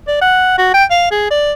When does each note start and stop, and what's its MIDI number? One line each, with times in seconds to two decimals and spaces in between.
0.07 0.19 74
0.22 0.55 78
0.58 0.73 66
0.74 0.84 79
0.90 1.10 77
1.11 1.27 68
1.30 1.52 74